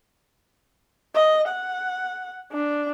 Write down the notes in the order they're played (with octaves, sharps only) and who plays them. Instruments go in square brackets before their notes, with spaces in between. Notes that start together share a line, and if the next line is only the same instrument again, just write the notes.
[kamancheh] D#5
F#5
D4